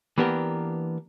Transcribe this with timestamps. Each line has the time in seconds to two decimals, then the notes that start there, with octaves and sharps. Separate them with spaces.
0.18 E3 A#3 B3 D4 G4 A#4